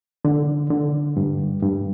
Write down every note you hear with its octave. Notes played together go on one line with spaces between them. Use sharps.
D3
D3
G2
G2